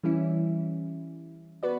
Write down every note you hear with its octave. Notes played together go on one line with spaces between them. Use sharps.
E3 G3 C#4 E4
B3 F#4 B4 D5